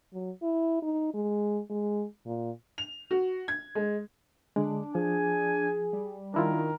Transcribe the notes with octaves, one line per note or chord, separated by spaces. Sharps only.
F#3
E4
D#4
G#3
G#3
A#2
F7
F#4
G#6
G#3
D3 G#3 D4
F3 G#4 G#5
G3
D#3 D4 E4 F4 A#4